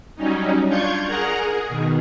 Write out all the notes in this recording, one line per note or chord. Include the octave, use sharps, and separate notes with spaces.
F#3 G3 C#4 D#4
D4 F4 C#6 G6 G#6
G#4 A#4 F#5 A#5
G#4
B2 D#3